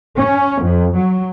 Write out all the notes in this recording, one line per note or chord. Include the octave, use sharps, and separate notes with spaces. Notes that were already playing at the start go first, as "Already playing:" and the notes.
C#4
F2
F#3